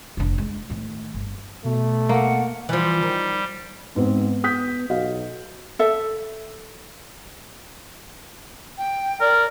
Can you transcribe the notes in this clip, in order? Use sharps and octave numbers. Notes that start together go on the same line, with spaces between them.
F1 D3
G#3
A2 D#3
G1
B2 A3
A#3 F#5
E3 F3 G3
D#3
G#2 B3 C4
D#6 G6 B6
B1 F#4 D#5 F5
A4 E5
G5
A#4 D5